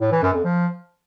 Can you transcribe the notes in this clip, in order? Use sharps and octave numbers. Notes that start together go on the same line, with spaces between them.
A2
E3
F#2
F2
F3